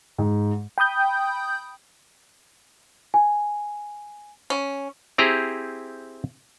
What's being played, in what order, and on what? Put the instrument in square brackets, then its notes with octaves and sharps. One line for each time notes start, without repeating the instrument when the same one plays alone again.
[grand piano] G#2
[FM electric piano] G5 B5 D#6 G6
[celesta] G#5
[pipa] C#4
[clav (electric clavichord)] C4 E4 G4 G#4 C5 A#5